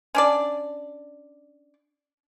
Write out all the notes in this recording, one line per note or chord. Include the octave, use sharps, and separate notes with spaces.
C#4 D4 D5